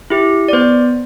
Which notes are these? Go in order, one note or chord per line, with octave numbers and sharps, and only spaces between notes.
E4 G4
D5
B3 C5